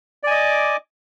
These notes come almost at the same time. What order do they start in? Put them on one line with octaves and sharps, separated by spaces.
D5 G#5 D#5 D6